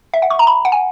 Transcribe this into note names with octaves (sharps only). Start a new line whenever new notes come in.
E5
F#5
C#6
A#5
B5
F#5
G#5